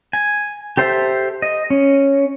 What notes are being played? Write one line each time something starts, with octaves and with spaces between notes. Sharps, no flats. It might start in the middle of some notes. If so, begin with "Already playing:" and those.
G#5
G4 A4 C5 E5
D#5
C#4